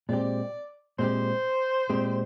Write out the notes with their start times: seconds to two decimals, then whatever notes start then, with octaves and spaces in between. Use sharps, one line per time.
0.09 A#2 G#3 C4 G4 D5
0.99 A#2 G#3 C4 G4 C5
1.90 A#2 G#3 C4 G4